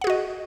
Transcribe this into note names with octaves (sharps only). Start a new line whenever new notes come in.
F#4 G#4 D#5 F#5